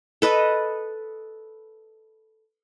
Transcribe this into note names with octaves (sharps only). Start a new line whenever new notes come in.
A4 B4 D#5